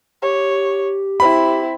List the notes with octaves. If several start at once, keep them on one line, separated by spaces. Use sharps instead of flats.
G4 C#5
C4 E4 B5